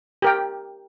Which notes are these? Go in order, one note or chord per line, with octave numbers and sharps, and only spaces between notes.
G4 A#4 G5